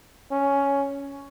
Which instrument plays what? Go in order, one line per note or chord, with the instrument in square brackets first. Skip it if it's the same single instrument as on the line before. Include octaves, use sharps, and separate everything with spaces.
[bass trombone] C#4